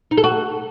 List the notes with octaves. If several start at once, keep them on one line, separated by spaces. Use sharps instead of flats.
D#4
A4
F#4